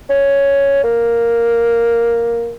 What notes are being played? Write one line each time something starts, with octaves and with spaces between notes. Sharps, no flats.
C#4
A#3